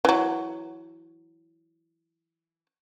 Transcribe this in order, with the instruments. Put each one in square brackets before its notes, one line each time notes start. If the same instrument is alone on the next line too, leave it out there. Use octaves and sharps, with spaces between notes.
[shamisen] E3 F#3